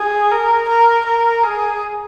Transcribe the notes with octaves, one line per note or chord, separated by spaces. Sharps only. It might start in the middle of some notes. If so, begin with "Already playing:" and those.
Already playing: G#4
A#4
A#4
A#4
G#4